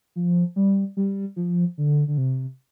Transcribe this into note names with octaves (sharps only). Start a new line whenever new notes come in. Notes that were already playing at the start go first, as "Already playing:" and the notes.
F3
G3
G3
F3
D3
D3
C3